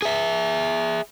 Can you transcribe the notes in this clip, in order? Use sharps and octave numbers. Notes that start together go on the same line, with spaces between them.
G#4 E5